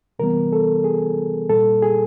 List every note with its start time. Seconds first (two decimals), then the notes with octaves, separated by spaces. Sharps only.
0.19 C3 E3 G3 B3 A#4
0.53 A4
0.84 G#4
1.49 A#2 G3 A#3 A4
1.82 G#4